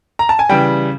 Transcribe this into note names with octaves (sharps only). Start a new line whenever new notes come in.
A#5
A5
G#5
C#3 E3 G3 G5